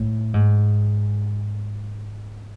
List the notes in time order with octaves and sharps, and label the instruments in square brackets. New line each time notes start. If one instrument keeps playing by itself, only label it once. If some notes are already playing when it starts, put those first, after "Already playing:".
Already playing: [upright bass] A2
G#2